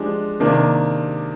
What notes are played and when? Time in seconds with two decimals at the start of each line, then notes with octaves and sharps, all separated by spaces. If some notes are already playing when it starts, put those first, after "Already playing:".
Already playing: F3 G#3 D4 G4
0.40 C3 D#3 A#3 D4